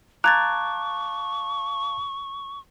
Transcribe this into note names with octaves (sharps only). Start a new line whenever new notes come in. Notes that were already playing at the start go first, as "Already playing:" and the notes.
F5 A5 A#5 C#6 D6 F#6 G#6 A6